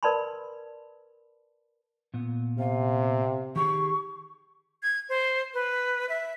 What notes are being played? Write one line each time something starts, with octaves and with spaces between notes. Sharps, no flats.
A#4 B4 D5 A5 B5 C6
A#2 B3
C3 F5
D#3 G4 G#4 C#6
G#6
C5
B4
E5